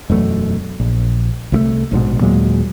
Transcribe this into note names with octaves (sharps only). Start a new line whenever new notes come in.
E1 F#2 A3
A#1
C2 F3 A3
A#1 G#2 B2
D#2 A#2 F#3 G#3